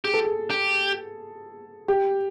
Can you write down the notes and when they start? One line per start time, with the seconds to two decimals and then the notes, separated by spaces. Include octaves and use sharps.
0.05 G4 G#4
0.14 A4
0.24 G#4
0.50 G4
1.88 G4